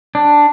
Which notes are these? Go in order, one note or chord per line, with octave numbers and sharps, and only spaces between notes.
D4